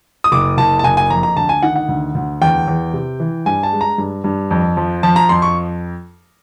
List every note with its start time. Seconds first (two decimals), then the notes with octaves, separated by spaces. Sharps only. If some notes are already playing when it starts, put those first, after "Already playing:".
0.24 D#6
0.32 F#1 D6
0.58 F#1 A5
0.79 A5
0.84 F#1 G#5
0.97 G#5
1.10 F2 A#5
1.23 A#5
1.37 D2 A5
1.49 G#5
1.63 D#3 F#5
1.76 F#5
1.89 D2
2.15 D2
2.42 E2 G5
2.68 E2
2.93 C3
3.20 E3
3.46 G2 G#5
3.63 A5
3.72 G#3
3.81 A#5
3.98 G2
4.24 G2
4.51 F2
4.77 F3
5.03 F3 A5
5.16 A#5
5.29 F2 C6
5.42 C#6